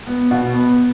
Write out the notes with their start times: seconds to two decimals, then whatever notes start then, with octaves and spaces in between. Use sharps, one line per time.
0.07 B3
0.31 B2
0.54 B3